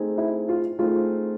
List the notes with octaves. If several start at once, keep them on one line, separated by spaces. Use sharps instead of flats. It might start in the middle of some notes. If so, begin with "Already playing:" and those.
Already playing: A3 C4 D#4 G#4
E4
F4
A3 C4 D#4 F4 G#4